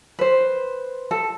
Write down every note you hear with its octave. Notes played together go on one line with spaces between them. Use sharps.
B4 C5
A4